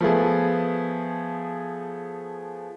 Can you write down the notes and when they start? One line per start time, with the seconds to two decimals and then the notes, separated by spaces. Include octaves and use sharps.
0.01 F3 A3 B3 G#4